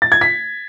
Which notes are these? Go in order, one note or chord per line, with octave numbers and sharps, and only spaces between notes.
A6
G#6
B6